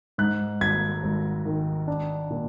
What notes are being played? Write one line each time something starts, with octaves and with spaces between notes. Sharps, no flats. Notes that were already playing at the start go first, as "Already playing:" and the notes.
G#2 F#6
G#1 G#6
G#1
D#3
D4
A#2